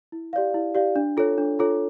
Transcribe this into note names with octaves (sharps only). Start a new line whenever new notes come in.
E4
G4 D5 F5
E4
G4 D5 F5
D4
F4 A4 C#5
D4
F4 A4 C#5